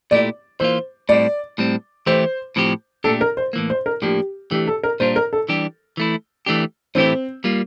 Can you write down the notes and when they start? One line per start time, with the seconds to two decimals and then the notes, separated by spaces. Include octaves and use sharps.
0.11 A#2 A3 E4 G4 D5
0.60 E3 A#3 F4 C5
1.09 A2 G3 C4 D5
1.58 A2 G3 C4
2.06 E3 A3 E4 G4 C5
2.56 A2 F3 C4 G4
3.04 A#2 A3 D4 G4 A4
3.21 A#4
3.37 C5
3.53 A2 E3 A#3
3.70 C5
3.86 A#4
4.02 A2 F3 A#3 D4 G4
4.51 E3 A3 D4 G4
4.67 A4
4.83 A#4
5.00 A#2 G3 D4 F4 C5
5.16 A#4
5.33 A4
5.49 E3 G3 D4 G4
5.97 E3 A3 E4
6.46 E3 A3 D4 G4
6.95 A2 E3 A3 C4 E4 G4
7.44 G3 A#3 F4